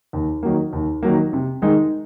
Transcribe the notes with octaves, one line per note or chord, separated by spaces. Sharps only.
D#2
D#3 F#3 A#3
D#2
D#3 F#3 A#3
C3
D#3 G#3 D#4